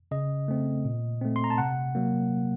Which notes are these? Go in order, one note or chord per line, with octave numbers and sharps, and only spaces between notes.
C#3 D#5
A3 C4
A#2
A3 C4
C6
A#5
A5
C3 F#5
F#3 A#3